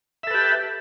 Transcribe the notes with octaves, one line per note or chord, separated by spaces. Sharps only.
G4 A4 B4 E5